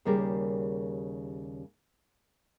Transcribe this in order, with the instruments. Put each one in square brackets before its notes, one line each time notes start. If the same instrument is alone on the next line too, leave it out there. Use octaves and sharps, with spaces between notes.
[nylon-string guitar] D#2 C#3 G3 G#4 A#4